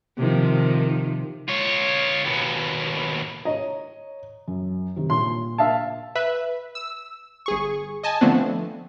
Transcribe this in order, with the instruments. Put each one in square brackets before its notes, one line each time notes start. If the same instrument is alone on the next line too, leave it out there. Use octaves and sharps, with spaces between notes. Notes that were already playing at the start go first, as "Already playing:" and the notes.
[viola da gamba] C3 D#3 F3
[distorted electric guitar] F4 C#5
D#2 B2
[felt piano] C#5 A#5 [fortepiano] D#5
[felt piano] F#2
C3 D#3 G3
[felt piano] A#2 [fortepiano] C6
[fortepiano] E5 F5 A5
[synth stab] B4 E5
E6
G1 G#4 C#6
D#5 G#5 A5
D3 F3 A3 B3 C4 D4